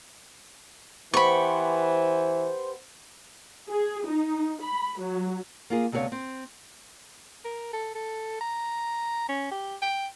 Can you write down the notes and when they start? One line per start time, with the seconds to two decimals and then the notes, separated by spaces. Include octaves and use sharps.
1.14 E3 B3 G4 C5 B5 C#6
3.70 G#4
4.05 D#4
4.62 B5
5.00 F#3
5.70 A#3 F4 G#4
5.92 D2 C3 B3 G#4 C#5 F5
6.12 C4
7.45 A#4
7.73 A4
7.95 A4
8.41 A#5
9.29 C#4
9.51 G4
9.82 G5